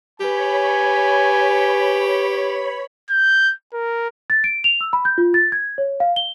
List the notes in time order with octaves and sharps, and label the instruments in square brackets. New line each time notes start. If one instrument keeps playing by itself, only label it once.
[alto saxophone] G4 [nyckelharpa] B4 [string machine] C#5 B5 [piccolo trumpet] G#5
[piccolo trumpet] G6
A#4
[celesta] A6
D7
F7
E6
B5
G6
F4
A6
G#6
C#5
F5
G7